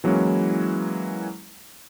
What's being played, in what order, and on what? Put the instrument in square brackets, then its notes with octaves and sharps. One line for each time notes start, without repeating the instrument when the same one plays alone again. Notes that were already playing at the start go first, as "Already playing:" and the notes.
[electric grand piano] E3 F#3 G#3 A#3 C#4 E4